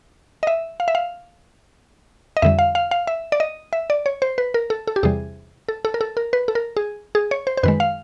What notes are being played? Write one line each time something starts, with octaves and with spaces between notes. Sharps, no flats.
D#5
E5
F5
E5
F5
D#5
F2 D3 G3 E5
F5
F5
F5
E5
D5
D#5
E5
D5
C#5
C5
B4
A#4
A4
A4
G4
E2 C3 E3 G3 G#4
A4
A4
A#4
A4
A#4
B4
A4
A#4
G#4
G#4
C#5
C5
C5
F#2 D#3 G#3 B4
F5